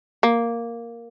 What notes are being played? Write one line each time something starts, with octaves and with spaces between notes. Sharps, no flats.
A#3